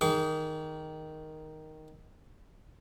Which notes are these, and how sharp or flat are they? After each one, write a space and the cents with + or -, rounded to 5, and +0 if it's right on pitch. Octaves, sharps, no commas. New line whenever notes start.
D#3 +0 G#4 +0 D6 -45